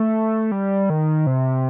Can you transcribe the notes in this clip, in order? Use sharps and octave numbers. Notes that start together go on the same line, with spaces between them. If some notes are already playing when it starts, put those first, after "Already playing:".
Already playing: A3
G3
D#3
C3